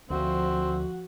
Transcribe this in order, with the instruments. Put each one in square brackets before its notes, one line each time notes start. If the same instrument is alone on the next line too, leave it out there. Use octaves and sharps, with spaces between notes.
[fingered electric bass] D2 [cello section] F3 [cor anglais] C4 [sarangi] F#4